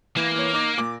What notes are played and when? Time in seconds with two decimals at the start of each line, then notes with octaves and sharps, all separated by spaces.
0.17 E3 A#3
0.36 E3 C#5
0.53 D#4 D6 A#6
0.78 A#2 D6